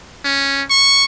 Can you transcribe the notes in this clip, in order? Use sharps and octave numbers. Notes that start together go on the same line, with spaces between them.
C#4
C#6